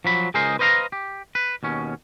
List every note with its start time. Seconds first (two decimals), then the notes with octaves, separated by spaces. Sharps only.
0.05 F3 F#3 B5
0.34 C#2 G#4 A#4 C5 D#5 C6
0.59 B4 C5 D#5 F5 A#5
0.92 G4
1.35 B4
1.63 D#2 B2 C#4